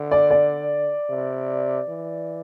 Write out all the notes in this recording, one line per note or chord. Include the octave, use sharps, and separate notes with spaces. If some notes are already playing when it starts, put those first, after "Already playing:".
Already playing: D3
D5
D5
C3
E3